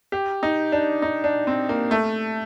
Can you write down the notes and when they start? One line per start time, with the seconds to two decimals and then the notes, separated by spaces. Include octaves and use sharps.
0.12 G4
0.43 D#4
0.72 D4
1.02 D#4
1.24 D4
1.47 C4
1.69 A#3
1.91 A3